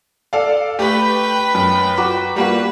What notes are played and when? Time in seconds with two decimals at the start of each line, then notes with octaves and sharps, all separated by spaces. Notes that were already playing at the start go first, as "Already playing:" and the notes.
0.33 A4 D5 F5
0.79 A3 G4 B4 G5
1.55 F#2
1.97 F#4 A#5 D6
2.36 G3 A#3 F#4 B4